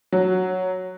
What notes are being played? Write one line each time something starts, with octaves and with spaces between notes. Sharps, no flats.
F#3